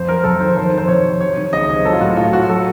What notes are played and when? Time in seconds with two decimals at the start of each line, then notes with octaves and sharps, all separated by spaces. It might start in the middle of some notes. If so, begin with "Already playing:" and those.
Already playing: F2 C5
0.09 F#3 A#4
0.24 F2 A4
0.40 D#3 C5
0.57 F2 C5
0.73 D#3 C5
0.88 F2 C#5
1.04 C3
1.20 F#3 C#5
1.37 D#3
1.53 C#2 D#5
1.69 C3
1.85 F#3 A4
1.93 F4
2.01 A2 F#4
2.17 A2 F4
2.33 F#3 F#4
2.49 F#3 A4